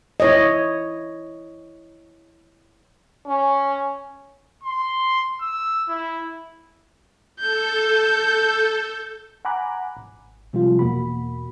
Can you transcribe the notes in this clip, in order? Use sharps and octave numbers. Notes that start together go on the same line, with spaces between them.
E4 C#5 D#5
C#4
C6
E6
E4
A4 G6
F#5 G#5 A#5 B5 D6 F#6
G#1
C3 F3 G3 G#3 F4
E2 B2 A#3 F#4 B5